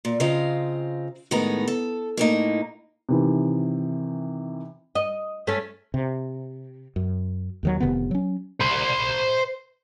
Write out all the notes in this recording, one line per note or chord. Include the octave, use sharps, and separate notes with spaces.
A#2
C#3 C4 F4 D#5 F5 A#5
A2 D#3 G#3 B3 A#5
A4
A2 A#3 D#4
C3 D#3 E3
D#5
A3 C#4
C3
F#2
D#2 D#3 F#3
F1 C3 D#3 B3
F#3 C#4
C5 B5